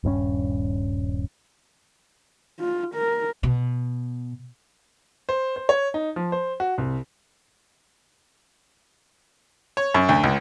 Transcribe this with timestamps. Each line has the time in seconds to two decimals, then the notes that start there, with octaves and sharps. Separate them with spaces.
0.04 D#1 G2 C4 C#4
2.60 F4
2.95 A#4
3.43 B2
5.29 C5
5.56 C5
5.69 C#5
5.94 D#4
6.16 F3
6.32 C5
6.60 F#4
6.78 C2
9.77 C#5
9.94 F#2
10.09 D2
10.24 C#2